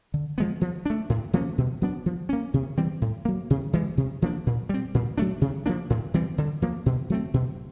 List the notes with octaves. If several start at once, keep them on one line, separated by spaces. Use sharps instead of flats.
D3
F3 G#3 B3
F3
A3 D4
A2
F3 A#3 C#4
B2
F#3 B3 D4
F3
A#3 C#4
C3
E3 G3 C4
A2
F#3 A#3
C3
E3 G#3
C3
F3 A#3 D4
A#2
G3 C4
A#2
F#3 A3 D4
C3
F3 A#3 D4
A2
E3 G3 C4
D3
F3 A#3
B2
F#3 A3 C4
B2